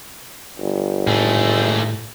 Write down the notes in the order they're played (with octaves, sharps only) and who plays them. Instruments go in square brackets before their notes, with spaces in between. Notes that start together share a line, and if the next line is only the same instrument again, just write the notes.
[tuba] G1
[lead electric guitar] D#2 A3 [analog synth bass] A2 [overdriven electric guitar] D#4 G#4